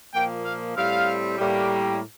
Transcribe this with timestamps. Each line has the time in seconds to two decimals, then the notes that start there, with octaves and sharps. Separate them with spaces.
0.14 A#2 F3 A#3 G5
0.45 F5
0.76 A2 G3 C4 F5
1.38 A2 G3 A#3